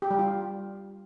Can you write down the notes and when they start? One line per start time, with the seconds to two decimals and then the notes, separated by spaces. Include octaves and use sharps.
0.02 G4
0.11 G3
0.19 F4